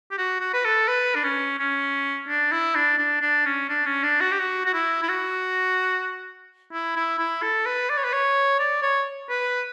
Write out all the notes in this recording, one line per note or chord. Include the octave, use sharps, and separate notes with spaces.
G4
F#4
F#4
B4
A4
B4
D4
C#4
C#4
D4
E4
D4
D4
D4
C#4
D4
C#4
D4
F#4
G4
F#4
F#4
E4
E4
F#4
E4
E4
E4
A4
B4
D5
C#5
B4
C#5
D5
C#5
B4